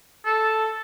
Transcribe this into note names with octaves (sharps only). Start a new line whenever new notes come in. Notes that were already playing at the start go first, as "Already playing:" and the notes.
A4